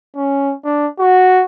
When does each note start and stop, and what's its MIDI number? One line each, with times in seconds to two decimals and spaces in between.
0.16 0.54 61
0.65 0.87 62
0.99 1.44 66